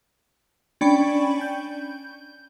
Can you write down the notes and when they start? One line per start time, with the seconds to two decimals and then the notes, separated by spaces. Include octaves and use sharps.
0.81 C#4 D4 D5 G5 B5 C#6
1.41 G6